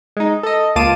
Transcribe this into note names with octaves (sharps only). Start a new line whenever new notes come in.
G#3 D#4
A4 D#5
C#2 A#3 F4 A5 D6 D#7